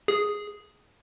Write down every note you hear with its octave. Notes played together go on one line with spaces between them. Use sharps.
G#4